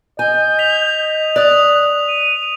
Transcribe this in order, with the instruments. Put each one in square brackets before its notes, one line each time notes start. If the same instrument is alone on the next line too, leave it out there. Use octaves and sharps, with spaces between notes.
[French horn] D#5 [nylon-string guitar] G#5 [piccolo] G6
[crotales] B6 F7
[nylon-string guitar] D5 [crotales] D#6 F7 [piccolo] F#6
[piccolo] D#7